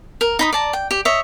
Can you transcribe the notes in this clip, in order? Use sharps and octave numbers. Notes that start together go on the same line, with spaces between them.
A#4
D#4 B5 D#6
D5 A5 A#5
G5
G4
C#5 D#5 E5